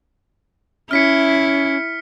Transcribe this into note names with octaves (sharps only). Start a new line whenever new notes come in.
C#4 E4 F6 B6 C#7